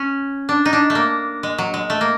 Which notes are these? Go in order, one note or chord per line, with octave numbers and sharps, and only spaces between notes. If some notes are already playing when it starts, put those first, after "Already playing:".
Already playing: C#4
D4
D#4
D4
A3
A#3
G#3
F#3
G#3
A3
A#3